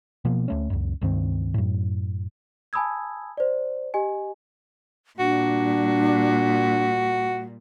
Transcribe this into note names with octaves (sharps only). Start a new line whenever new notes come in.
B2 F3 A#3
D2 A3 C#4
C#2 F#2
C#2 G2 D#3 C4
F#2 A2
G#5 A5 B5 D#6 E6 G#6
C5 D5
G4 D#5 G#5
A#2 G3 D4 F#4